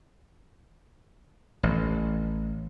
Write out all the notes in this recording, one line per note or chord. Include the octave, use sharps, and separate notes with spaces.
A1